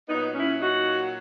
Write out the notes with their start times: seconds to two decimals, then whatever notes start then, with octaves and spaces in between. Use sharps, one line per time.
0.08 A#2 F#3 B3 D#4
0.34 C#4 E4
0.60 D#4 F#4